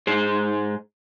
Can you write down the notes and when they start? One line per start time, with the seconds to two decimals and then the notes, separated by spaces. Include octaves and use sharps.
0.07 G#2 G#4 C5